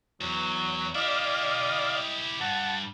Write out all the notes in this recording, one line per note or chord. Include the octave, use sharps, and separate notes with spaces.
E2 F#3
E4 G4 D5 D#5 F5
G2 F#5 A5